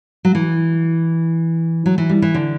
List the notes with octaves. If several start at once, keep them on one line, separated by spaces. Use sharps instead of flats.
F#3
E3
F#3
E3
G3
E3
D3